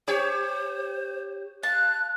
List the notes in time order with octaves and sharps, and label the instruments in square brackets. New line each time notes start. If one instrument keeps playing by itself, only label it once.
[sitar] G4 C#5 [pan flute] C5
[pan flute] F5 [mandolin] A5 [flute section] F#6